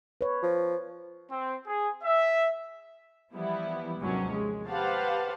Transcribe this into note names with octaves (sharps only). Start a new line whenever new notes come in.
B4 C#5
F3
C4
G#4
E5
E3 F3 G3 B3 E4
D#2 G#2 C3 F3 F#3 C#4
G#3
G4 B4 C5 F5 F#5 A5